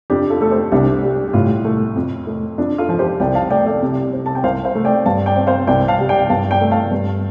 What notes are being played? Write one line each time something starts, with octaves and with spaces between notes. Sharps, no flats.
F2 D4 G4
F4 A4
A3 A4
G4 C5
C2 D4 G4
G3
G4
A2 F4
A3
F2
A3
F2 D4
F4 A4
F3
G4 C5
C2 D5 G5
F5 A5
A3 D5 G5
A4 D5
C3
C4
A5
G5
C2 C5 F5
C5 F5
A3
D5 G5
G2 F5 A5
D5 G5
C4
C5 F5
C2 D5 G5
F5 A5
G3
D5 G5
G2 F5 A5
D5 G5
A3
F5 A5
G2